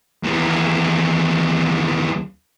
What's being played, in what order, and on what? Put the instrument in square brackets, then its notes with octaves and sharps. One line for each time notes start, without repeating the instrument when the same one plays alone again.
[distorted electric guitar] D#2 E3